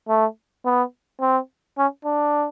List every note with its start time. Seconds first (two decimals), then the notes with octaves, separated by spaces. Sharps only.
0.09 A3
0.66 B3
1.21 C4
1.78 C#4
2.05 D4